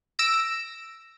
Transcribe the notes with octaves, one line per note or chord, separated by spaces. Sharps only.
E6 A#6 D7